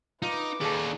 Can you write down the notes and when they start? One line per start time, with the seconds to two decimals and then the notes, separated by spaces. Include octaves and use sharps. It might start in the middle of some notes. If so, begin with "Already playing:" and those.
0.22 D#4 F4 B4 D6
0.61 D#2 D#4 G#4 A4 D5